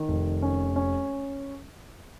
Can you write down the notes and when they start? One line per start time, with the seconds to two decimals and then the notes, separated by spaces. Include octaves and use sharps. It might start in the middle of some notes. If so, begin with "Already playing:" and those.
Already playing: D#3
0.08 F1
0.42 C#4
0.76 C#4